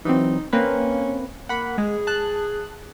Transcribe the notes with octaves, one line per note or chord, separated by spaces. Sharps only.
E3 F#3 C4 D#4
A#3 C4 C#4 B4
A#3 F#5 B5
G#3 G#4
A5 F#6